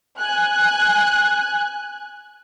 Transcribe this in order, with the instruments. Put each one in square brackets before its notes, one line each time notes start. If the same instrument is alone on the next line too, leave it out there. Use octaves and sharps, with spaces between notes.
[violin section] G#5 F#6